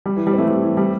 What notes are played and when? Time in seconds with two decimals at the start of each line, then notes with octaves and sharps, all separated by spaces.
0.06 G3
0.16 E3
0.27 G3
0.33 C4
0.38 E3 A3
0.48 G3
0.63 E3
0.77 G3